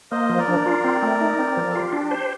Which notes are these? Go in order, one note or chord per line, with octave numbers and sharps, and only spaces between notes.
A#3 C5 D#5
F3
A#4 D5
D4
F4
C4
A3
D#4
C4
F3
A4
F4 G4
D4
C5